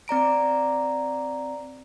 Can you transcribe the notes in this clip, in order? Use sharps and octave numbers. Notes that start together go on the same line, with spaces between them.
C4 D5 A#5 D7